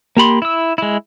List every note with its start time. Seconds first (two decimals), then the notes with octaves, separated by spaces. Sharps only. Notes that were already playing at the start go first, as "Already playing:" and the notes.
0.17 A#3 G4 B5 C6
0.42 E4 E6
0.78 G#3 E4